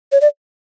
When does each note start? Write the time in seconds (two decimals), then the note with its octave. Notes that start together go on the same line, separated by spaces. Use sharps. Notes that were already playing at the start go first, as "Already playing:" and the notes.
0.12 C#5
0.21 D5